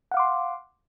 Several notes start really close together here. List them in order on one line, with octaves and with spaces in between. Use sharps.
F#5 F5 D6 C6